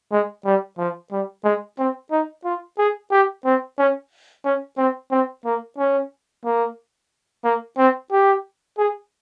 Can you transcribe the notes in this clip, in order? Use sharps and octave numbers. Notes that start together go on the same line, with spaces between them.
G#3
G3
F3
G3
G#3
C4
D#4
F4
G#4
G4
C4
C#4
C#4
C4
C4
A#3
C#4
A#3
A#3
C4
G4
G#4